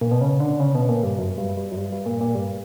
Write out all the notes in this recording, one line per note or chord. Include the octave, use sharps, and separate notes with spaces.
A#2
B2
C#3
D3
C#3
B2
A#2
G2
F#2
G2
G2
F#2
G2
G2
A#2
A#2
G2